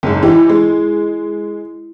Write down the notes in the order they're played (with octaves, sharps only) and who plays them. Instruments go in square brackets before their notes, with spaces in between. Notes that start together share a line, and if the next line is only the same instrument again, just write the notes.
[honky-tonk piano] F#1 G#2
[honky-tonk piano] E3 G4 [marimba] E4
[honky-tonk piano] G#3